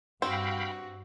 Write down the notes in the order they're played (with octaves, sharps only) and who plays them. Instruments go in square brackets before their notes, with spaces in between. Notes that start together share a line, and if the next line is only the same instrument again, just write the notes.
[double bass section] G2 [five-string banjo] C4 [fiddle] F#4 [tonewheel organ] F5 G5 B5